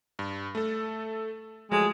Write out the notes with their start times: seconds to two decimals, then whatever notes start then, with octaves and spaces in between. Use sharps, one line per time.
0.19 G2
0.55 A3 A4
1.71 F3 F#3 G#3 A3